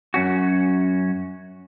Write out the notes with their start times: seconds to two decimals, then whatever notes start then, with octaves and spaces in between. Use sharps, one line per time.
0.14 F#2 C#4 F#4